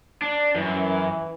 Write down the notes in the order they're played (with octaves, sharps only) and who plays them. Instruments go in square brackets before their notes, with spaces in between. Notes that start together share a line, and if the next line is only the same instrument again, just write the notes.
[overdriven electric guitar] D4
[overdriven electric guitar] F#2 [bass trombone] E3